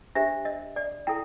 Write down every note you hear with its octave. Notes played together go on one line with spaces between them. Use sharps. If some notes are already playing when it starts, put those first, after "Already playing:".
D4 G4 C5 E5
D#5
D5
E4 A4 G5